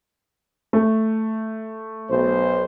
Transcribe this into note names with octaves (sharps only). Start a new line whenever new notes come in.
A3
B1 C5